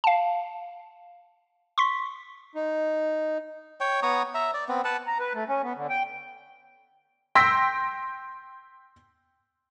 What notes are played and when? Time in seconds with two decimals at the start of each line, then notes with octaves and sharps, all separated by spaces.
0.04 F5 A5
1.78 C6 C#6 B6
2.55 D#4
3.80 C#5 G5
4.03 B3 C#5 A#5 D#6
4.34 E5 A#5
4.54 D5
4.69 B3 C4
4.85 B4 F#5 A5
5.07 A#5
5.20 B4
5.35 A3
5.48 C#4
5.63 B3
5.76 D3
5.89 G5
7.35 G5 C6 E6 G6 A#6 B6